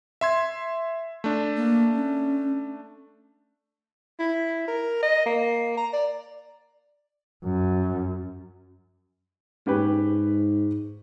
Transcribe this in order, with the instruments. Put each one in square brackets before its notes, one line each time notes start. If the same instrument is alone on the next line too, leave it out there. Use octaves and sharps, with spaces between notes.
[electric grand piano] E5 C6 G#6
A3 D4
[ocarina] A#3
C#4
[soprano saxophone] E4
A#4
D#5
A#3
A#5
D5
[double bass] F#2
[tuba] G#2 [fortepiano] C#4 G4 B4